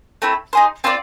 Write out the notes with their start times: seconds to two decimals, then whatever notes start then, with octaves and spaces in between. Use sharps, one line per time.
0.22 A3 C4 E4
0.53 D#4 G#4 C5
0.84 C4 F4 A#4 D5